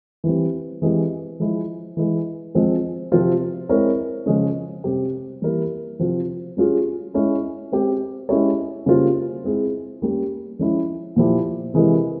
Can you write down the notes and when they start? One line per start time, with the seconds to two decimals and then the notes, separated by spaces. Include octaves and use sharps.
0.24 E3 G3 C4
0.82 E3 G#3 C4 G4
1.40 F3 G#3 E4
1.97 E3 G#3 E4
2.55 F3 G#3 C4 F4
3.12 C3 F3 C4 F4 C5
3.69 G#3 C4 E4 A#4 C#5
4.26 C#3 F3 G#3 C#4
4.84 C3 G3 C4 G4
5.42 E3 G3 A#3 E4 A#4
5.99 C3 F3 C4 F4
6.57 G3 C#4 F4 G#4
7.14 G#3 C#4 E4
7.72 G#3 C4 G4
8.29 G#3 C#4 E4 G4 C#5
8.86 C#3 G3 A#3 F4 C5
9.44 G#3 C4 E4 G#4
10.02 G3 A#3 C#4 G4
10.59 F3 G#3 C#4 E4
11.16 A#2 F3 A#3 E4 G4
11.74 C3 E3 G#3 E4 A#4